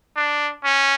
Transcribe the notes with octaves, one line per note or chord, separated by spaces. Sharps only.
D4
C#4